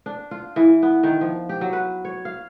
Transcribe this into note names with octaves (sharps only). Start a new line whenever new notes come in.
D4
F4
E3
B3
D#3
F3
G4
F#3
B4
C#5
F5